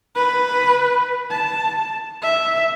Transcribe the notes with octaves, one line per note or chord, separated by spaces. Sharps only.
B4
A5
E5